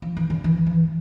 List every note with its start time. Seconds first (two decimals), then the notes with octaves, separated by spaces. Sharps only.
0.02 F3
0.17 E3
0.30 D3
0.44 E3
0.66 F3